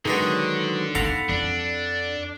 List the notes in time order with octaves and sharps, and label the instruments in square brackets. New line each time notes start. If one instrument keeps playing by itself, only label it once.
[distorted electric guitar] D3 [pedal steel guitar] D#3 F#3 D#5 [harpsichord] G#3 B3 D4
[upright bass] B3 D#4 [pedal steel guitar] A4 F#5 B5 [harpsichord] F5 A#5
[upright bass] F2 [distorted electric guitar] D4